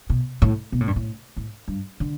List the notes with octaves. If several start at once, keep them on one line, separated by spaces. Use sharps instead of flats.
B2
A2
B2
A2
G2
A2
A2
G2
D3